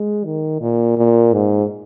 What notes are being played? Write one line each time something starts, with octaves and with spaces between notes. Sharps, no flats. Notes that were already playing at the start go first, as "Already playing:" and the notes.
Already playing: G#3
D#3
A#2
A#2
G#2